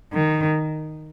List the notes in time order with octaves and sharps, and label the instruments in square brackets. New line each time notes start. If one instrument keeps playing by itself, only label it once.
[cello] D#3